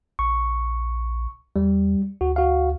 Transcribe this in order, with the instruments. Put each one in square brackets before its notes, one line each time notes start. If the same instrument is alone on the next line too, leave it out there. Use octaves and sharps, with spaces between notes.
[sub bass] A#1 [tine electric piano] C#6
[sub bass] E2 [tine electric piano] G3
[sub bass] D2 [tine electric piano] F#4
[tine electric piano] F#4 F5